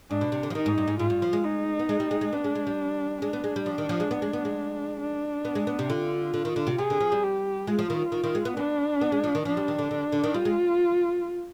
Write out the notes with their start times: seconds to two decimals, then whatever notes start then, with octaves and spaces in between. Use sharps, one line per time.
0.11 G#2 D4
0.21 B2
0.32 C3
0.43 D3
0.50 F3
0.55 D#3 D#4
0.66 G#2
0.78 G2
0.88 G#2
1.00 G#2 F4
1.10 G2
1.22 F3
1.33 G#3
1.44 D#4
1.79 B3
1.89 G#3
2.00 G3
2.11 G#3
2.21 G#3
2.33 B3 D4
2.44 G#3
2.55 G#3
2.67 G3
3.22 G#3 D4
3.33 B3
3.44 G#3
3.56 G3
3.66 F3
3.78 D#3
3.89 F3
4.00 G#3
4.11 B3
4.22 G#3
4.33 B3
4.45 G#3
5.00 D4
5.45 B3
5.55 G#3
5.67 B3
5.79 C3
5.89 D3 F4
6.34 D3
6.45 D#3
6.56 D3
6.67 C3
6.78 C3 G#4
6.90 D3
7.00 F3
7.12 G3
7.23 G4
7.67 G#3 F4
7.79 F3
7.90 D#3
8.12 D#3
8.24 D#3
8.35 G#3
8.45 B3
8.57 B3 D4
9.01 B3
9.12 G#3
9.24 F3
9.35 D#3
9.45 F3 D4
9.57 G3
9.68 D#3
9.79 D3
9.91 D3
10.12 D3
10.24 D#3
10.34 G3 F4
10.45 G#3